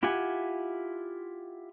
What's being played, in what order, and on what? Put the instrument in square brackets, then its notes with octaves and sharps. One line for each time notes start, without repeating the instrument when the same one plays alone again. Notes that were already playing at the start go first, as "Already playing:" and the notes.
[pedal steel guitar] E4 F4 G4 F#5 G#5